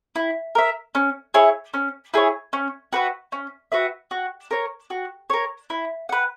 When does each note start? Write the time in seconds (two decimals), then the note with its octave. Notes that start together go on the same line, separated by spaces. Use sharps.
0.16 E4
0.55 A#4 E5
0.95 C#4
1.34 E4 G#4 C#5
1.74 C#4
2.14 E4 G#4 C#5
2.53 C#4
2.93 F#4 B4 E5
3.32 C#4
3.72 F#4 B4 E5
4.11 F#4
4.51 A#4 C#5
4.90 F#4
5.30 A#4 C#5
5.70 E4
6.09 B4 F#5